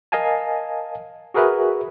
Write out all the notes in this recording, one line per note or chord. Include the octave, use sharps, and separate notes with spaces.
A#4 D#5 F5 G#5 A5
F#4 G#4 A#4 B4 E5